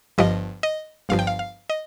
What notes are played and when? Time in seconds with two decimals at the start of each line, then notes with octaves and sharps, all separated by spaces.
0.18 G1 G2 F3 D#5
0.63 D#5
1.09 G1 G2 F3 F5
1.19 G5
1.27 F5
1.39 F5
1.70 D#5